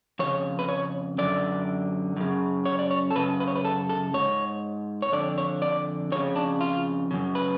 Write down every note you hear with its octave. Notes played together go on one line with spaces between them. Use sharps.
F2 C#3 C#5
B4
C#5
F#2 D3 D5
F#2 C#3
C#5
D5
C#5
A4
F#2 C#3 B4
B4
C#5
B4
A4
A4
G#2 C#5
C#5
F2 D3 D5
C#5
D5
F2 C#3 C#5
D4
F4
F#2 C#3
B4